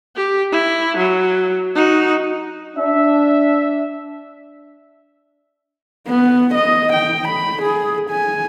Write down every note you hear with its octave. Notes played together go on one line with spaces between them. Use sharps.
G4
E4
F#3
D#4 F#4
D4 E5
B3
D#5
G5
B5
G#4
G#5